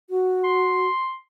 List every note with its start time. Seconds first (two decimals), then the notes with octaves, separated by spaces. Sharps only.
0.10 F#4
0.44 C6